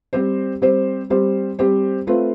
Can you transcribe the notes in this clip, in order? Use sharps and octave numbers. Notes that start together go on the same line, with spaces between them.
G3 C4 G4 C5
G3 C4 G4 C5
G3 C4 G4 C5
G3 C4 G4 C5
A3 C4 F4 B4